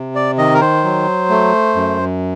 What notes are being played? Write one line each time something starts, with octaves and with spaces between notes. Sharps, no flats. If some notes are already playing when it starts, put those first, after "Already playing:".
Already playing: C3
D5
D#3 D#5
A#4
C5
F#3
A3
F#2